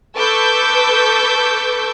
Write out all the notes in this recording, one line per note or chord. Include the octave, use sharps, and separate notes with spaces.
A4 B4 C#6 D6 E6 G6